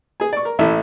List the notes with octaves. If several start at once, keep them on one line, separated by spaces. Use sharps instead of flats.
G#4 G#5
D5 C#6
A#4
A1 A2 E4 A4 E5